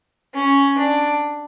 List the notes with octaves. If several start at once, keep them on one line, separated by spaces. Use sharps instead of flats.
C#4
D4